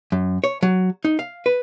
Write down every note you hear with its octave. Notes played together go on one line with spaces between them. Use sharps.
F#2
C#5
F#3
D#4
F5
B4